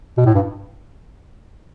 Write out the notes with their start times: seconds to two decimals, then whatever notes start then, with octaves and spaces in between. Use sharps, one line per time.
0.18 B2
0.26 A2
0.35 G2